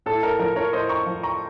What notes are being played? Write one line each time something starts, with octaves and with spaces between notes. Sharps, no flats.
A2 A4
A#4
F3 A#4
A#4 C#5
A2 C5 D#5
A#5 C#6
F3
A#5 C#6